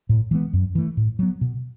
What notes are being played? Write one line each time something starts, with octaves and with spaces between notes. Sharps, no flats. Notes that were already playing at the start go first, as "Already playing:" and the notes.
A2
E3 G#3 B3
F#2
E3 A3
A2
F#3 B3
B2